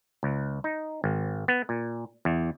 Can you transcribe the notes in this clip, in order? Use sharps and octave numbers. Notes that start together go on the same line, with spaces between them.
C#2
D#4
G#1
B3
A#2
E2